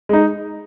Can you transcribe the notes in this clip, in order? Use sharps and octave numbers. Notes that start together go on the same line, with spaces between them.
G#3 D#4